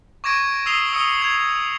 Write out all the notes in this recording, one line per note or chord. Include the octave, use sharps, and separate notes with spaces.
C#6 D6 G#6 A#6 D7 D#7
D#6 E6 C7 F7 G7
D#6 E6 C#7 G7
G#6 F7